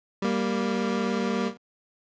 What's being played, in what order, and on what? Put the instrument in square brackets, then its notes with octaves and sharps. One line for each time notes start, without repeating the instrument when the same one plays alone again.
[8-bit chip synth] G3 A#3